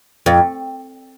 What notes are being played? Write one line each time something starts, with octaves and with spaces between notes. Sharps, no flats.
F2